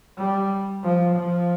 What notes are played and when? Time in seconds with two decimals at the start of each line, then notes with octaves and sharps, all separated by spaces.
0.18 G3
0.84 F3
1.16 F3